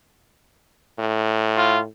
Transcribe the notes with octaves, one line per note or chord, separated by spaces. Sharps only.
A2
F4